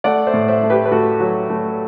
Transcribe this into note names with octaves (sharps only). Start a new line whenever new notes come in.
A3 D5 F#5
C5 E5
A2
C5 E5
A3
G4 B4
B4
A3 F#4 A4
F#3
A3